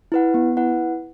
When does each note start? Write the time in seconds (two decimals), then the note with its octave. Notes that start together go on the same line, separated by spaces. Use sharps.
0.12 E4 B4 F#5
0.34 B3
0.57 E4 B4 F#5